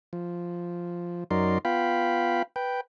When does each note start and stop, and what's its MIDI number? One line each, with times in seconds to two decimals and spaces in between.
0.13 1.24 53
1.31 1.58 42
1.31 1.58 54
1.31 1.58 63
1.31 1.58 70
1.31 1.58 74
1.31 1.58 84
1.65 2.42 59
1.65 2.42 65
1.65 2.42 77
1.65 2.42 79
1.65 2.42 83
2.56 2.81 71
2.56 2.81 79